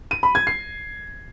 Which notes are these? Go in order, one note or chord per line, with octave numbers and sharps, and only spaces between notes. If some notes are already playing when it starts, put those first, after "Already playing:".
D#7
B5
G#6
C7